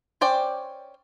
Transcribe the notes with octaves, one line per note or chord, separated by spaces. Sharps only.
C#4 C5 D5 G5